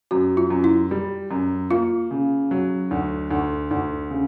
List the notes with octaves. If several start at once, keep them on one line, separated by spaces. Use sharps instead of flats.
F#2 F#4
F4
F#2
E4
G3
F#2
A#3 F4
C#3
F#3
D2
D2
D2
C#3